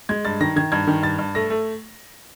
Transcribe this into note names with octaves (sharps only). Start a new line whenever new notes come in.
G#3 G#6
G2 A6
D#3 A#6
D#3 G#6
G2 G#6
D#3
G2 A6
G2
A3 A#6
A3